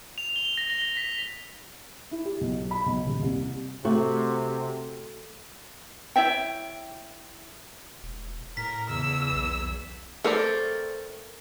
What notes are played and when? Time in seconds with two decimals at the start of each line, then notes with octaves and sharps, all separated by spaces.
0.18 F7
0.36 G7
0.57 A#6
0.70 G7
0.82 A#6
0.97 B6
2.11 E4
2.25 G4
2.41 B1
2.71 B5
2.86 B1
3.07 D#1
3.22 C2
3.85 C3 A3 F#4
6.16 E4 C#5 E5 G5
8.03 E1
8.57 A2 A#4 B6
8.90 E2 C#3 E6
9.33 B1
10.24 A3 C4 A4 A#4 D5